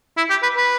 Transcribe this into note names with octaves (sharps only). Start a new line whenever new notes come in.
E4
G4
B4
B4